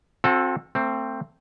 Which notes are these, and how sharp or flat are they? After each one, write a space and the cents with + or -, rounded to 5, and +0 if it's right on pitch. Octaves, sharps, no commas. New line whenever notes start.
C4 +20 F#4 -40 A4 +0
A3 +30 C4 +0